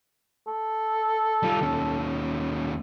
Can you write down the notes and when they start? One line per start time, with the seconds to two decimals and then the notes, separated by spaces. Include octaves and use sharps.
0.48 A4
1.43 G3 F4
1.61 D#2 C#4